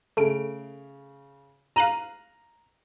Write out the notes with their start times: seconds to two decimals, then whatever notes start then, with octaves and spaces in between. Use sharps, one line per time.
0.17 C#3 A3 D7
1.76 F5 A#5 F#6 D#7